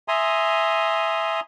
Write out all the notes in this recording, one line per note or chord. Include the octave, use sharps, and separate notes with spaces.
E5 G#5 A#5 C6 D#6